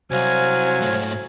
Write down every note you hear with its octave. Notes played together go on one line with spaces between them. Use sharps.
C2 F#3 C5 F5 G#5
G#2 A3